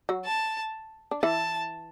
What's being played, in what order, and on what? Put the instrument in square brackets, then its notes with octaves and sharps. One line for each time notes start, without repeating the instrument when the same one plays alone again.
[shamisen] F#3 F#4
[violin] A5
[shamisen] D4
[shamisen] E3 E4 [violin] A5